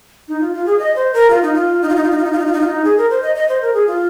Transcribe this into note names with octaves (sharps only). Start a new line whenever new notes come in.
D#4
F4
F4
G#4
D#5
C5
A#4
F4
D#4
F4
D#4
F4
D#4
F4
D#4
F4
D#4
F4
D#4
F4
D#4
F4
D#4
G#4
A#4
C5
D#5
D#5
C5
A#4
G#4
F4